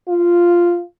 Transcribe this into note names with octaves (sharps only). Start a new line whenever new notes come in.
F4